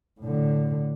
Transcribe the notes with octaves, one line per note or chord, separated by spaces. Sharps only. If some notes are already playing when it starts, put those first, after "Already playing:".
A2 D3